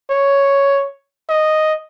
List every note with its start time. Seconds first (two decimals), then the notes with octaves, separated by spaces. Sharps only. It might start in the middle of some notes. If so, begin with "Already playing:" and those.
0.10 C#5
1.29 D#5